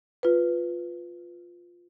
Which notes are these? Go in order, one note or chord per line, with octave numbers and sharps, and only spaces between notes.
F4 B4